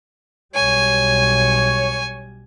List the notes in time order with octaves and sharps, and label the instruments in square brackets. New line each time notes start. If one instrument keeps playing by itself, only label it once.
[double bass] B1 G3 [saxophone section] C#5 [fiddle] G#5